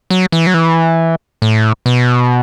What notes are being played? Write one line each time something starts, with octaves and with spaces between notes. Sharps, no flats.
F#3
E3
F#3
E3
A2
B2